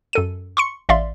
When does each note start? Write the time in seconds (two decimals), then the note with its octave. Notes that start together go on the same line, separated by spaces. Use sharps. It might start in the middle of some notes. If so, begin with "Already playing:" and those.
0.13 F#2 A4 D#7
0.57 C6 C#6 C#7
0.89 A1 D5 E5 F5 C6